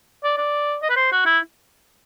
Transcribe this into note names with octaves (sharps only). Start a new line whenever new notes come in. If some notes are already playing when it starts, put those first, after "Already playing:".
D5
D5
D#5
B4
C5
F#4
E4